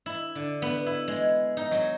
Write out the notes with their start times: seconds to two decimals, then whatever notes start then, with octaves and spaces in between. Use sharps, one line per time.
0.06 E4
0.35 D3
0.62 B3
0.86 E4
1.08 G#3
1.57 D#4
1.71 F#3